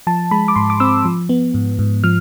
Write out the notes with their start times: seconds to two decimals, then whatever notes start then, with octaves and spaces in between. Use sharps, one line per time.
0.07 F3 A5
0.31 G#3 B5
0.48 D6
0.56 G#2 C6
0.70 D6
0.80 C4 E6
1.05 F3
1.29 B3
1.54 G#2
1.79 G#2
2.04 F3 F6